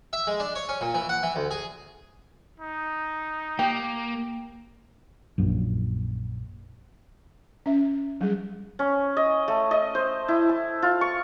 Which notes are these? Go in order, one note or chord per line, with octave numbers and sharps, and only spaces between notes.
E5
G#3
D4
C#5
C#4
A#2
E3
F#5
E3
D2
G#4
D#4
A#3 G4
A#1 F#2 A#2
C#4 E5
F#3 G3 G#4
C#4
D#5
A3
D#5
C5
E4
A5
F4
C#6